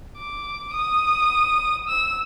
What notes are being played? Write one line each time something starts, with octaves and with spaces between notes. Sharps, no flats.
D6
D#6
E6